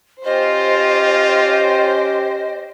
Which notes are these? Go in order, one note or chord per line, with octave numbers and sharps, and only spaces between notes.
C#4 F4 G4 C5 D#5 G5